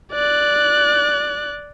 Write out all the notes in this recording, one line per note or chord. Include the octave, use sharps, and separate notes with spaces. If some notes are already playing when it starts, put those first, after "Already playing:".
D5 F#6